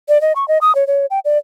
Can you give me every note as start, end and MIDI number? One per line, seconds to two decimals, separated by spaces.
0.09 0.21 74
0.21 0.33 75
0.36 0.47 85
0.48 0.58 75
0.61 0.75 87
0.75 0.87 73
0.87 1.06 73
1.11 1.19 79
1.25 1.38 74